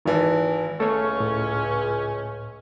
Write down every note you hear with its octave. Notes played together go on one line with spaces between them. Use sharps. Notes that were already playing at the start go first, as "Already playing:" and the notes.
G#1 D#3 E3 A5
C#2 A3 C#4 A4 C#5
A2